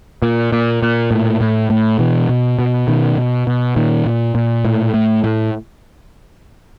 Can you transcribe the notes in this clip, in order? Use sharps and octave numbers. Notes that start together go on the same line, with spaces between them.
A#2
A#2
A#2
A2
A2
A2
B2 E3
B2
B2
B2 D#3
B2
B2
A#2 D#3
A#2
A#2
A2
A2
A2